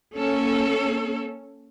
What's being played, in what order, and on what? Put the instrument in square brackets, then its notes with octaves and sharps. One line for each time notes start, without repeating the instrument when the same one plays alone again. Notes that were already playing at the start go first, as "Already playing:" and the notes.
[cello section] A#3 C#4 A4 C#5